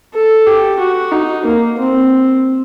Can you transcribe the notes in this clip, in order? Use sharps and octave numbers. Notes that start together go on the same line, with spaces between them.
A4
G4
F#4
D#4
A#3
C4